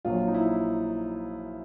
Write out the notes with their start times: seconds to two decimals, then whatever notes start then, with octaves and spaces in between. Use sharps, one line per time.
0.05 A#1 A#2 F#3 F4
0.28 D#4
0.34 E4